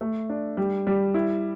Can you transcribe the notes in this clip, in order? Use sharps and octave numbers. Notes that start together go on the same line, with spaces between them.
A3
D4
G3
G3
E4